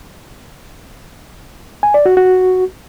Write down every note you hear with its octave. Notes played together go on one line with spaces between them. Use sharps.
G#5
D5
F#4
F#4